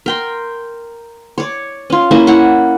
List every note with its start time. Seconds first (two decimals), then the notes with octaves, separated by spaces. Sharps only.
0.06 A#4 G5 C6
1.38 C#5 D5
1.90 C#4 F4
2.11 A#3 C#4 E4 E5
2.27 E4 C#5 F#5